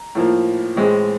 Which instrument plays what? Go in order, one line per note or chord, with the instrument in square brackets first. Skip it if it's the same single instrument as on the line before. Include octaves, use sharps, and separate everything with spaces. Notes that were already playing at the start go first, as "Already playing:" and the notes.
Already playing: [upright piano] A#5
A2 F3 A#3
A2 E3 G#3 C4